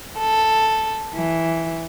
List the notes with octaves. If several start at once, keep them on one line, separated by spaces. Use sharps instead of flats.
A4
E3